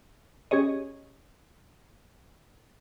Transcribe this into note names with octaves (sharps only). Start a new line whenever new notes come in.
C#4 G4 G#4 C#5 D#5